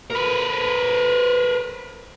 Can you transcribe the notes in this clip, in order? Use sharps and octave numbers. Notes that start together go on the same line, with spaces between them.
A#4 B4